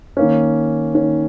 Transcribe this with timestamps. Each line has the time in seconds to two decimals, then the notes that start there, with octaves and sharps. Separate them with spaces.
0.17 D#3 A#3 C#4
0.94 D#3 A#3 C#4